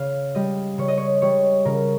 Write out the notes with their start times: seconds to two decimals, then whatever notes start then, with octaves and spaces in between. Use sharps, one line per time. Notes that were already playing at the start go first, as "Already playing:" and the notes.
Already playing: C#3 F5
0.35 G3 D#5
0.78 C#3 C#5
0.88 D#5
0.98 C#5
1.22 G3 C#5
1.65 C#3 A#4